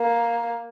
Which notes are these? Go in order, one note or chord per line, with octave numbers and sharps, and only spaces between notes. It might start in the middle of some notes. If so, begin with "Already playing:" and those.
Already playing: A#3